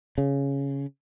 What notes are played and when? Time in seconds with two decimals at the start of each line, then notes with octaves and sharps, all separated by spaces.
0.18 C#3